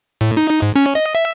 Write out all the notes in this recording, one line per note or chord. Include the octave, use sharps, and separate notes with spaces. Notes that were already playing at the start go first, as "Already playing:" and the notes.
A2
D#4
D#4
G#2
C#4
D#5
E5